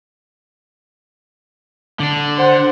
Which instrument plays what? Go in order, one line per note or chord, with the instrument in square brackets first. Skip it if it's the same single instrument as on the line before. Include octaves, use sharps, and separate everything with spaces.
[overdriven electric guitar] D3 D4
[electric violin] C5 F#5